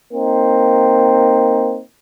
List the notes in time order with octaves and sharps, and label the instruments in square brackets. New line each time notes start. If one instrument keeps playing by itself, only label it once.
[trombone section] A#3 C4 D#4